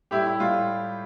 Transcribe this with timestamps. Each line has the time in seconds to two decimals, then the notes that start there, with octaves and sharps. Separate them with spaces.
0.11 A2 G3 E4 G4
0.26 E4
0.39 A2 G3 F4